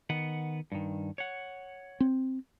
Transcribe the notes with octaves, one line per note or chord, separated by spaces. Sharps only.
D#3 B3 F#5
G2 D#3
C#5 F#5
C4